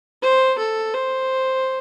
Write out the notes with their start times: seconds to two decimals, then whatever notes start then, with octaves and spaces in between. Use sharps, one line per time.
0.22 C5
0.58 A4
0.94 C5